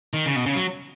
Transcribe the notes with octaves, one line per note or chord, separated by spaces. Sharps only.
D#3
C#3
B2
C#3
F#3